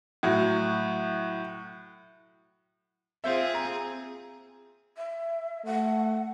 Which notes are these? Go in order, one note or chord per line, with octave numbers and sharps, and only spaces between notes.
A2 F#3 F#4
C4 F4 G#4 C5 E5
A#5
E5
A3 F#5